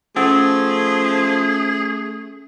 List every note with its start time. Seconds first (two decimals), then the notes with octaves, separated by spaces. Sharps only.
0.16 F3 A3 C#4 G#4